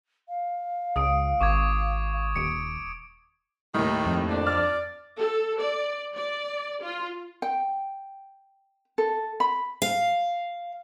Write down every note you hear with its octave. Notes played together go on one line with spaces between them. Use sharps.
F5
C#2 D#6 D7
G#1 C#6 D6 G#6
D#1 C#7 D7
D#2 A2 D#3
F2
D4
D5 F6
A4
D5
D5
F4
G5
A4
B5
F5